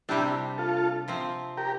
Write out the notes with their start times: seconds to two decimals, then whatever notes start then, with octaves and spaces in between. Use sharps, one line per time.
0.09 C3 G3 D4 E4 G4
0.58 F4 A4
1.08 C3 F3 C4
1.57 G4 A#4